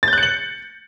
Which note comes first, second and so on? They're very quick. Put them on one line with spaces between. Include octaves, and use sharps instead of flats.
A6 G6 F#6 C#7 F#7